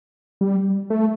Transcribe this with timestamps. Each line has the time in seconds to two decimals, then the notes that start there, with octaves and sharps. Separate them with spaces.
0.41 G3
0.90 A3